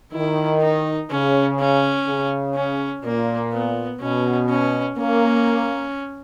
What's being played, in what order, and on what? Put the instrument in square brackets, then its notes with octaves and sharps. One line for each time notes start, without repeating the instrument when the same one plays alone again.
[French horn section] D#3 [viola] E4
[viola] D#4
[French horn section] C#3 [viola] C#4
[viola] C#4
[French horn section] C#3
[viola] C#4
[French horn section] A#2 [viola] A#3
[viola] B3
[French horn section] B2 [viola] C#4
[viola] C#4
[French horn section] A#3 [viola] C#4